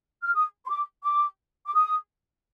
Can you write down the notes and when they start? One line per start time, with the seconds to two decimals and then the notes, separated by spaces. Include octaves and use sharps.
0.22 F6
0.33 D#6
0.65 C6
0.69 D6
1.03 D6
1.66 D6
1.74 D#6